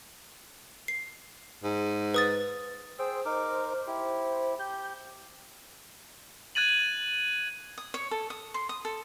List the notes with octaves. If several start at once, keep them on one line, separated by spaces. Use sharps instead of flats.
C7
G#2
B4 D#6 A6
G#4 C5 G5 E6
D#4 A#4 D6
E4 G4
G4 G6
F#6 G#6 A6 D#7 F#7
D#6
C#5
A4
D#6
C6
D#6
A4